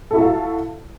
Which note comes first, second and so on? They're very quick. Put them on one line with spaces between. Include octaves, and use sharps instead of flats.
A4 E4 F#4 A5 F5